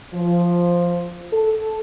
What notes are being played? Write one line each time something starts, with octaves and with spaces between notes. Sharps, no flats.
F3
A4